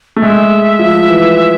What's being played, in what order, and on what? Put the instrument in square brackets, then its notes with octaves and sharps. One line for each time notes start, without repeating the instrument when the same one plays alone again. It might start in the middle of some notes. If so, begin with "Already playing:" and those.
[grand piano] A3
[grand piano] G#3 [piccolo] E5
[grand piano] F3
E3